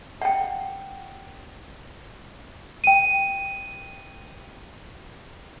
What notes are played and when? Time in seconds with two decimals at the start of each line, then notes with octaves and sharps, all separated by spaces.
0.22 F#5 G5
2.84 G5 D#7